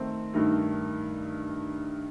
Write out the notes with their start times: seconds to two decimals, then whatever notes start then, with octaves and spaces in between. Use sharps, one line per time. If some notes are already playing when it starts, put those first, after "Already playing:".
Already playing: D#3 A3 C4
0.34 G2 D#3 A3 D#4